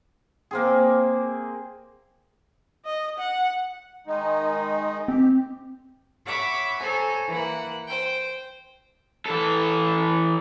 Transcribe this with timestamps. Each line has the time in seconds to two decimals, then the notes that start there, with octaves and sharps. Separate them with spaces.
0.51 A#3 C4 G#4
2.85 D#5
3.18 F#5
4.07 D#3 G#3 D#4
5.08 C4 G4
6.26 C#5 E5 F#5 B5 D6
6.80 A4 C5 C#5 G#5 A#5
7.27 E3 A#3 F#5
7.87 C5 G5
9.26 E3 A4